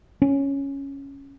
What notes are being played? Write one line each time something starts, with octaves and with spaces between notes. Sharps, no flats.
C#4